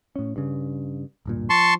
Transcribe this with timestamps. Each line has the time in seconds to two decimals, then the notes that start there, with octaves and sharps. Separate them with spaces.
0.16 A2 C#4
0.36 G2 C#3
1.26 D1 G2 A#2
1.50 F3 A5 C6 C#6